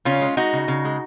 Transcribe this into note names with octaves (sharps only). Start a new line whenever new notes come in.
C#3 C#4 F4
G#3
G#3 D#4 F#4
C#3
C#3
G#3